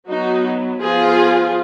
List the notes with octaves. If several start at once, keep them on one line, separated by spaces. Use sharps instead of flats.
F#3 B3 D#4 F#4
F3 B3 F4 G#4